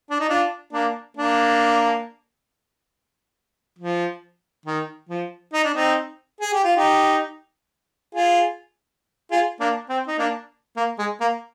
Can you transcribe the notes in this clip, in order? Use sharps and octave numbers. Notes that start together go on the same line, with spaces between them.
D4
D#4
D4 F4
A#3 D4
A#3 D4
F3
D#3
F3
D#4
D4
C4 D#4
G#4
G4
F4
D#4 G4
F4 G#4
F4 G#4
A#3 D4
C4
D#4
A#3 D4
A#3
G#3
A#3